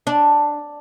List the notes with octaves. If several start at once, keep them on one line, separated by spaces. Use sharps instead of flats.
D4